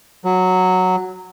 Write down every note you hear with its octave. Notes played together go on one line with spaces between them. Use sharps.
F#3